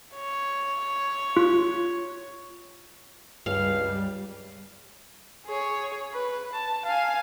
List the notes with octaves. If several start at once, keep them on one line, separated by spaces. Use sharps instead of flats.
C#5
F4
C#2 G2 G3 F5
G#4 C#5
B4
A5
F5 G#5